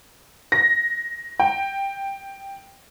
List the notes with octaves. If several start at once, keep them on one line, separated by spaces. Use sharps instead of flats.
A#6
G5